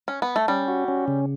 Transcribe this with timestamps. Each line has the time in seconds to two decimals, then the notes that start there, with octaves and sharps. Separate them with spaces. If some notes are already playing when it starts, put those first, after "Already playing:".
0.08 C#4
0.22 B3
0.36 A3
0.48 G3 C#4
0.68 F#4
0.88 C#4
1.08 C#3